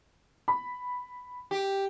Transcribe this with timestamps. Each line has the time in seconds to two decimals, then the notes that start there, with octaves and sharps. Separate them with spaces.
0.48 B5
1.51 G4